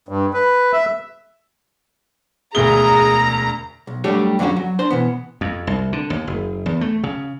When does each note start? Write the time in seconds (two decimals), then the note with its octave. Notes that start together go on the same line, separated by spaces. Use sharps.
0.09 G2
0.33 B4
0.73 E5
2.55 E1 D2 G#4 A#5 G7
3.87 B1
4.04 F#3 G3 A3 D4 G4 C#5
4.39 F2 D3 F#3 C#4 F#4
4.56 F#3
4.79 D4 C5 C6
4.91 B2 E3 B3
5.41 F2
5.67 C2
5.93 D3
6.10 D#2
6.27 F#1
6.66 E2
6.81 A3
7.04 C#3